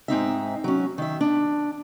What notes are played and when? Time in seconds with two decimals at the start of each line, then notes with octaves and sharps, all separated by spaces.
0.08 G#2 C4 D#4 E5
0.64 F#3 C#4
0.98 D#3 E5
1.21 D4